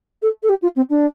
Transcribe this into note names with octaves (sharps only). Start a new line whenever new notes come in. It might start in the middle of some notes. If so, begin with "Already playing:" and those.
A4
A4
G4
F4
C4
D4